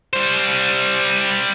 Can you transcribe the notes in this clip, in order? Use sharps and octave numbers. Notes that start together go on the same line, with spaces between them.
G3 C5